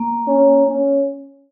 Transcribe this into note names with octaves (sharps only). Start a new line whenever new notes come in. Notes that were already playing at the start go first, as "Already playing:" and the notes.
Already playing: A#3
C#4
C#4